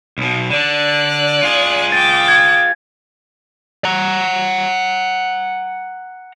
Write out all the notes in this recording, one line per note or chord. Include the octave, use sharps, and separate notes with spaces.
B1 B2
D3 D5 F#6
F4 G#4
G5 D6 A6
G#6
F#5 A#5